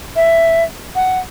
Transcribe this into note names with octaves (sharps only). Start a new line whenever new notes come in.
E5
F#5